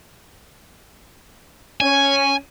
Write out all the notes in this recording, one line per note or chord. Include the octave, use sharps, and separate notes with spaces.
C#4 G#5